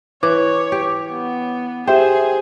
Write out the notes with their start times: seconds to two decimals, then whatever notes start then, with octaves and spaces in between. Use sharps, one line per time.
0.23 E3 C#5 D6
0.72 G4
1.10 B3
1.87 G4 G#4 C5 E5 G5